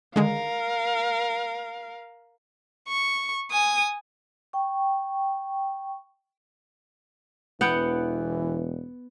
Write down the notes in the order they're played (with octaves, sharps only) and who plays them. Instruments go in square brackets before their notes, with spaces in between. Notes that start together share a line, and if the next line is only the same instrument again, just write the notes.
[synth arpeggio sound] D3 D#3 G#3 [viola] A#4 F5
[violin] C#6
G#5 D#6
[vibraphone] G5 C#6
[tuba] E1 [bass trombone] E3 [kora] B3 F#5 G5